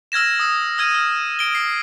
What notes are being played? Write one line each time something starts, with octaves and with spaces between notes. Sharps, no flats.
E6 F6 G#6 A#6 E7
D#6 E6
E6 F6 G#6 D#7
F6
D7 G7
C7